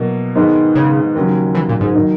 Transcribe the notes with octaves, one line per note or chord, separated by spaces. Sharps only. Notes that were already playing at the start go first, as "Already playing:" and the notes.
Already playing: B2 F#3 A#3 E4
G#2 D#3 G#3 B3
C#3
D#2 C#3 F#3 C#4
E3
A#2
G#2
D#3 F#3 A#3 D#4